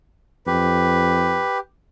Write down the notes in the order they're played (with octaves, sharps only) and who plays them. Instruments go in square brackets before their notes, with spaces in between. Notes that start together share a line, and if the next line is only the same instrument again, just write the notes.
[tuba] F2 [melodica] G4 [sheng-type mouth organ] B4